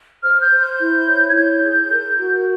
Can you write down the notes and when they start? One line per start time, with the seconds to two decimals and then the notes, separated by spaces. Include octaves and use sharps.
0.22 C5 F6
0.41 G6
0.51 C5
0.60 G6
0.79 E4
1.07 C#5
1.29 G#6
1.35 E4 G6
1.63 G#4
1.90 A#4
2.19 F#4